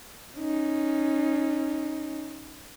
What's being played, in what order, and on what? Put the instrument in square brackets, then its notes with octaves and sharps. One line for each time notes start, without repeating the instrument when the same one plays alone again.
[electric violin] C#4 D#4